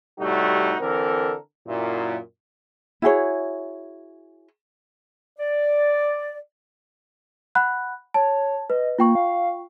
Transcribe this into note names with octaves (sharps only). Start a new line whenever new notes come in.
A2 C3 G3 A3 D#4 F#4
D3 E3 C4 A4 A#4
F#2 A#2 E4
E4 F#4 G#4 C#5
D5
F#5 B5 F#6
C#5 A5
B4 D#5
A#3 F4 G5 C#6
F5